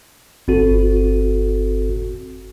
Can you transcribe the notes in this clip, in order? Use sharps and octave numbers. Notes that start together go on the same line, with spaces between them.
G1 C4 F#4 A4